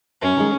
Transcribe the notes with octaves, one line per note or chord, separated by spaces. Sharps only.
F#2 C#4
D#3 G#3